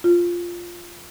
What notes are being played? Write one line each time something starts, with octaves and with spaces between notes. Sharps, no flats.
F4